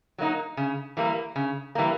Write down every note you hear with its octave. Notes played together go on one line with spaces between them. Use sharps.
F#3 A#3 D#4
C#3
E3 G3 A#3
C#3
E3 G3 A#3